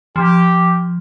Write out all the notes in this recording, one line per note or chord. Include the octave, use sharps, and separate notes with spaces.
F3 G4